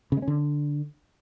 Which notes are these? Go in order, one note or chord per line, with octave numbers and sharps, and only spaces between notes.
C#3
G#3
C#4
D3